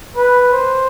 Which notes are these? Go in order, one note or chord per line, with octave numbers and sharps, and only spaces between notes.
B4
C5